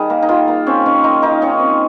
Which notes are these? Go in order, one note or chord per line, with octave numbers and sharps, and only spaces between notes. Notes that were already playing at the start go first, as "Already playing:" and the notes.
Already playing: D#3 G3 G#4 A#4
A#3
D#4
D#3 F4
A#3
C4 C#4
D#3 C#4
D#3 D#4
D#3 D#4
D#3 C#4
C4